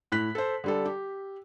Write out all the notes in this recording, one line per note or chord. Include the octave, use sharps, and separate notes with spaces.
A2 F#6 B6
A4 C5
D3 G3 A4
G4